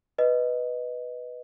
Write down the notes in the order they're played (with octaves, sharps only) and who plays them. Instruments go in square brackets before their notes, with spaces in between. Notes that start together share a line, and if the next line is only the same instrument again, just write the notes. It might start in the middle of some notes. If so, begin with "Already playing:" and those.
[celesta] B4 D#5